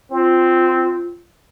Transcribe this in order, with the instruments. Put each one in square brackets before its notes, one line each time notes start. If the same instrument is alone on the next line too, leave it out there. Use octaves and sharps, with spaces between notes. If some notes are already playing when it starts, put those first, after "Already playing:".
[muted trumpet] C4 [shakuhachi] F4